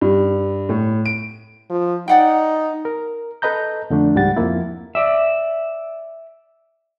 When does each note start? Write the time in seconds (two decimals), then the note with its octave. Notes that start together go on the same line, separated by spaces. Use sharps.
0.01 G2
0.69 A2
1.06 D7
1.70 F3
2.08 D#4 D5 F#5 G5
2.85 A#4
3.42 A4 B4 D#5 A#5 G6
3.90 F2 D3 A3 D4
4.15 C#2 G#2 G3 G4 F#5 A6
4.37 F2 F3 A#3 E4
4.95 D5 E5